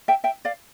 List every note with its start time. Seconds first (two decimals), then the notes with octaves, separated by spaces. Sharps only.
0.08 E5 G5
0.24 E5 G5
0.45 D5 F5